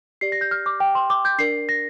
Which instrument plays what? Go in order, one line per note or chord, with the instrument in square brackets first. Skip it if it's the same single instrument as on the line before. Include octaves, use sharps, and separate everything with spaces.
[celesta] G4 D5 C7
A#6
G6
F6
D6
G5
C6
D6
G6
D4 A#4 D5 C7
A#6